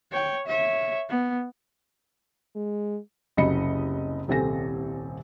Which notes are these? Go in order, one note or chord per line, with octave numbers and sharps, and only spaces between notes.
C#5 G5
C#5 E5
B3
G#3
F#1 C2 F#3 D#5 B5 C#7
D#1 C2 C4 A4 G#5 A#6